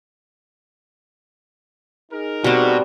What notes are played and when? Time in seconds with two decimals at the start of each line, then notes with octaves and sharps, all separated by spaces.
2.12 D#4 G#4 A#4
2.44 B2 G3 C4 F#4